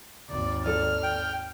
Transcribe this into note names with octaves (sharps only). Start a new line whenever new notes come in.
G#1 D#2 D5
A4 D5 F6
G5